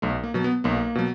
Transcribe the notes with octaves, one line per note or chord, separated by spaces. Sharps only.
B1 A3
A#3
B2 F#3
B3
B1 A#3
B2 F#3